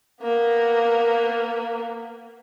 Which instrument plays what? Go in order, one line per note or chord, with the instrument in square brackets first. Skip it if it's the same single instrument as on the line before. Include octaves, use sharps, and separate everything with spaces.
[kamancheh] A#3 B3